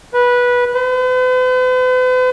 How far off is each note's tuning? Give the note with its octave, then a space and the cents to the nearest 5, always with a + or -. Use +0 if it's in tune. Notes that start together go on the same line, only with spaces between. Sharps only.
B4 -15
B4 +45